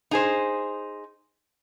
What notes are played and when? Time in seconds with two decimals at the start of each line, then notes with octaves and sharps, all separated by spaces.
0.11 D#4 G#4 C5